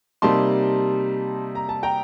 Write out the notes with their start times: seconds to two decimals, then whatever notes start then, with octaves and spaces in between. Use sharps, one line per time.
0.22 C3 G3 A#3 D#4 A5 C6
1.55 A#5
1.69 A5
1.83 G5 A#5